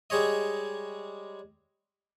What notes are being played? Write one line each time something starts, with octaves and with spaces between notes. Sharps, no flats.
G3 G#3 G#4 C#5 D#5